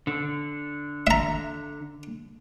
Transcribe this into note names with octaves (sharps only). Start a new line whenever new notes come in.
D3
E5 A#5